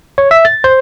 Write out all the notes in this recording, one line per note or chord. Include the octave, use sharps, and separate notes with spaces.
C#5
E5
A6
C5